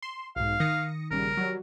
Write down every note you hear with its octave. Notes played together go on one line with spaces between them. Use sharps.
C6 E7
B1 G#2 F5
D#3 D#6 A#6 C#7
A#1 C#3 G3 A#4
F#3 G3